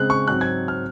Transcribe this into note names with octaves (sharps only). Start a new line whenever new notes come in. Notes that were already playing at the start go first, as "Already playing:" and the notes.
Already playing: C#3 G#3 C4 F#6
C#6
G#2 F#3 C4 F#6
G#6
F6